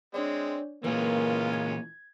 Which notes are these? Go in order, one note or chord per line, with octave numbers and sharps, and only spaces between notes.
G#3 C4 D4 C#5 D5
A#2 E3 G#3 A#3 C#4 F4 A#4 B4
G#6